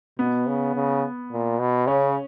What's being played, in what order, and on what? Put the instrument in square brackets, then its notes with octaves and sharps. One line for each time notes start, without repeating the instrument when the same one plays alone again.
[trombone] B2 [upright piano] B3
[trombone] C#3
C#3
A#2
B2
[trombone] C#3 [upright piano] C#4